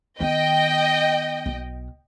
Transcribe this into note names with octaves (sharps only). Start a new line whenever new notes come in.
D#3 B3 D#5 G5
B1